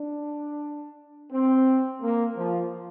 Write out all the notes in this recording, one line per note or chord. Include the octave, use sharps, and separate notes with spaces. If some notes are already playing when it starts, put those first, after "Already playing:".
Already playing: D4
C4
A#3
F3